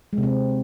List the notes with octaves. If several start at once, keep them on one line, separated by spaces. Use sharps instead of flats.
G#3
C3
C4